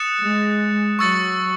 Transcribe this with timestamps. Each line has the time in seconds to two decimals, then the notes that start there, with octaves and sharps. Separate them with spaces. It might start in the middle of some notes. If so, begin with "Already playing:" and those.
Already playing: D#6 F#6 A6 C#7 E7
0.22 G#3
0.99 F#3 C#6 E6 A6 C#7